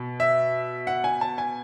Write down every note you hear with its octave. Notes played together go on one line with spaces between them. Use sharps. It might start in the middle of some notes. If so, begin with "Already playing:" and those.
Already playing: B2
E5
F#5
G#5
A5
G#5